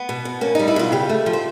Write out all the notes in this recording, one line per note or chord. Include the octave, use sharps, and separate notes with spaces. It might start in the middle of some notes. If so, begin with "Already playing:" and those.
Already playing: B3
B2
B2
A#3 C#4
G3 D#4
E4
B2 F4
C#3 G4
A3
F3
C5